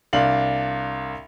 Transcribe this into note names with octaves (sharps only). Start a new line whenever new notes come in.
C2 D4 F5 F#7